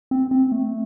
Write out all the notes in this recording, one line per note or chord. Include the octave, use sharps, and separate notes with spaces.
C4
C4
A3